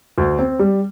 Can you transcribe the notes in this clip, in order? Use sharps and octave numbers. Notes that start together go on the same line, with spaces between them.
D2
C4
G3